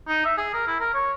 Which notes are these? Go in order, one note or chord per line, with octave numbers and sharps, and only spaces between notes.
D#4
E5
G#4
A#4
E4
A#4
C#5